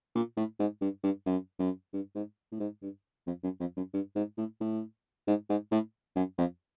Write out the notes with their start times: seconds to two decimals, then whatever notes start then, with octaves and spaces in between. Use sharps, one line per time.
0.15 A#2
0.37 A2
0.59 G#2
0.81 G2
1.03 G2
1.26 F#2
1.59 F#2
1.93 G2
2.15 G#2
2.52 A2
2.60 G#2
2.82 G2
3.27 F2
3.43 F#2
3.60 F2
3.77 F#2
3.94 G2
4.15 G#2
4.38 A2
4.60 A2
5.27 G#2
5.49 G#2
5.72 A2
6.16 F#2
6.38 F2